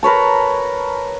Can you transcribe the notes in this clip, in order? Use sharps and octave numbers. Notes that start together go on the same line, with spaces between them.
A#4 B4 C#5 A5